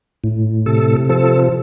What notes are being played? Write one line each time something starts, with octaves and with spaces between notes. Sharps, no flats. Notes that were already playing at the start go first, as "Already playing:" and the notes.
A2
C3 A4
F3 A4